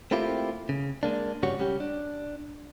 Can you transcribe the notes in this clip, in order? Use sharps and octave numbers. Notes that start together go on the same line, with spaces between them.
A3 A#3 C4 E4 F4 G4
C#3
G#3 A#3 D4
C#2 G2 C#3 G3 F#4 C#5
C#2 G3 C#4 G4
D4